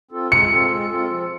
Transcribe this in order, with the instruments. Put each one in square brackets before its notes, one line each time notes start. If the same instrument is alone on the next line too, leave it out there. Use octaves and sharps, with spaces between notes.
[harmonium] C4 F4 A4
[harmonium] G#3 [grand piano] C#7
[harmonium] C4 F4 A4
G#3
C4 F4 A4
F3